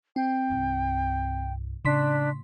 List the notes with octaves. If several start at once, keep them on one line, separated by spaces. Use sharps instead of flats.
C4 G5
C2 G2
A2 C#3 D4 C6 B6